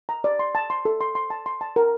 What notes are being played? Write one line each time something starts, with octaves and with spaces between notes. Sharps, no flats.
A#5
D5
C6
A5
C6
A4
C6
C6
A5
C6
A5
A#4